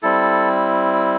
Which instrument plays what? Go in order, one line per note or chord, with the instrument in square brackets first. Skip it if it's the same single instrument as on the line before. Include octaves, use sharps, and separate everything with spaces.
[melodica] G3 C4 E4 A4